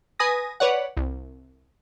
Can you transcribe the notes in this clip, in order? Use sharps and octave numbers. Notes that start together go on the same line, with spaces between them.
B4 G#5 D#6 A#6
B4 C#5 D5 F#5
C2